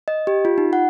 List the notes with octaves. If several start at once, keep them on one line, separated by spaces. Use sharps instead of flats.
D#5
G4
F4
D#4
F#5